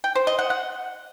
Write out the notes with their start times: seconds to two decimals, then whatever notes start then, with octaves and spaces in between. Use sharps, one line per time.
0.04 G5
0.15 C5
0.27 D#5
0.39 F#5
0.50 F#5